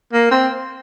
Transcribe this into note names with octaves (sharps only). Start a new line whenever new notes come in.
A#3
C4